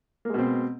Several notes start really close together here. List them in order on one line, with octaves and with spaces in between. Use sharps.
A#3 G#3 B2 C4